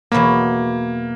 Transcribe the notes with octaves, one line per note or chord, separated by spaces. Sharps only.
E2 B2 F#3 A#3 B3